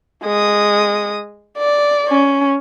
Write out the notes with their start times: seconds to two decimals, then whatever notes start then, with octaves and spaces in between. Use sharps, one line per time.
0.23 G#3 D#6
1.58 D5
2.09 C#4